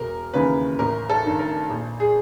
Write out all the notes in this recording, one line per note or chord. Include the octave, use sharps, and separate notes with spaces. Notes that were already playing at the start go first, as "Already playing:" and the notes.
Already playing: E1 A#4
D#2 C#3 E3 B4
A1 A#4
A4
G2 D#3
A#4
A#1
G#4